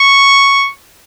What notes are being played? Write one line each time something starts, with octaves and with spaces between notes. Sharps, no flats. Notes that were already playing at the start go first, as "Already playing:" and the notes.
Already playing: C#6